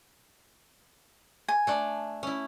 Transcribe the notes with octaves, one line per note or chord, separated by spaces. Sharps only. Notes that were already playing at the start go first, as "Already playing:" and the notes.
G#5
A3 D4 D5
C#4 E4